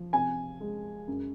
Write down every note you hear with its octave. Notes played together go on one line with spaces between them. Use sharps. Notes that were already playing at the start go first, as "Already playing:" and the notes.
Already playing: F3
C3 G#5
G#3
F#2